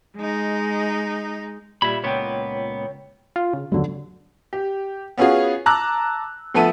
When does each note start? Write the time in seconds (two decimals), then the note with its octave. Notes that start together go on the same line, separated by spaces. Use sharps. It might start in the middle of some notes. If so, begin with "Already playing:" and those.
0.16 G#3 D#4
1.82 A#2 G3 E5 B5 G#6
2.04 C#2 A#2 B3 C#5 G5
3.36 F4
3.53 C#3
3.72 D#2 D3 F#3
4.53 G4
5.18 B3 C#4 F4 F#4 G#4
5.66 A5 A#5 D6 E6 F#6
6.54 D2 F3 B3 A4 E5 D#7